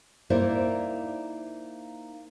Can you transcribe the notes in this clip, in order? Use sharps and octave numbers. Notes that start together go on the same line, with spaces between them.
A#3 D#4 E4 A#4 C5 D5